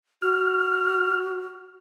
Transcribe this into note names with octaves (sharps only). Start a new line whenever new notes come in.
F#4 F6